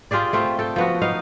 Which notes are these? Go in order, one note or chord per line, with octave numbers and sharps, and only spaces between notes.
F4 G4 G#4 D5
A3 C4 F4
A4 G5
F3 B3 F#4
B3 D#4 F5